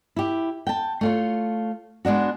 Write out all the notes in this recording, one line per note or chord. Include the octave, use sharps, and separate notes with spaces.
E4 G4
G5 A5
A3 F4 C#5
G#3 B3 D4 F#4